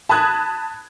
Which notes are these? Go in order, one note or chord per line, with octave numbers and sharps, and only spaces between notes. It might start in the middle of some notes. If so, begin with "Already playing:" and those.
A5 B5 D#6 F#6 G#6